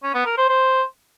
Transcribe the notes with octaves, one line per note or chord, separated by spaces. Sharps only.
C#4
B3
A#4
C5
C5